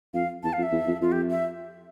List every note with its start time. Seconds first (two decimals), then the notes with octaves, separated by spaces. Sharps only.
0.14 F2 F5
0.43 E2 A5
0.53 F5
0.58 F2
0.63 E5
0.72 E2
0.87 F2
1.01 F2 F4
1.12 G4
1.30 E5